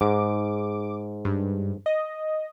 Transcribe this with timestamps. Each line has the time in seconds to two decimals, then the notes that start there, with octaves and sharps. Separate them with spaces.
0.01 G#2 D6
1.25 G2
1.86 D#5